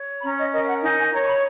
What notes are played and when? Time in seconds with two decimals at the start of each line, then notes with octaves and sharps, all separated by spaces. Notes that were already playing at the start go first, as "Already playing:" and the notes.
Already playing: C#5
0.19 B5
0.24 C#4 A#5
0.39 D#5
0.52 A#4 D#5
0.63 F5
0.68 F#5
0.82 D#4 G#5
0.97 G#5
1.12 C#5 A#5
1.22 C#6
1.27 B5